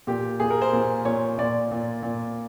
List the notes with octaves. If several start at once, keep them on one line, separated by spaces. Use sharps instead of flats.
A#2 G4
A#2 G#4
A#4
C5
A#2
A#2 C#5
A#2 D5
A#2
A#2